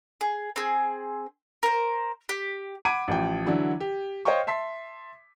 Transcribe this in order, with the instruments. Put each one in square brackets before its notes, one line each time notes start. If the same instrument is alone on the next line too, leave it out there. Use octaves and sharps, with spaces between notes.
[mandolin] G#4
C4 G#4
A#4 C5
G4
[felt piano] F#5 B5 D6 G#6 D7 D#7
A1 F3 G5
D3 E3 F#3 D4 E4
G4
C5 C#5 D#5 F5 G5 C#6
E5 A5 C6 B6